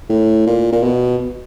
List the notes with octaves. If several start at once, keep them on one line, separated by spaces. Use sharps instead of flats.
A2
A#2
A#2
B2